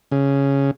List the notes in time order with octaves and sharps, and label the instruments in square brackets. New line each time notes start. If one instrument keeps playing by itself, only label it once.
[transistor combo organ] C#3